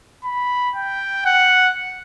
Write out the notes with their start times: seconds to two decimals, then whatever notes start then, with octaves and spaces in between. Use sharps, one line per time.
0.24 B5
0.75 G5
1.25 F#5